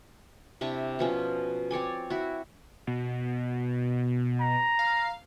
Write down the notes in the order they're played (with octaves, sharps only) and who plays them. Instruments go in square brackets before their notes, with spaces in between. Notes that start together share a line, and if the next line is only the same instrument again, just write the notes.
[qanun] C3 D4 E4 C#6
B2 F3 C#4
C4 C#5 D5 G#5
E4 F#4
[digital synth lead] B2
[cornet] A#5
[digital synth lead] F5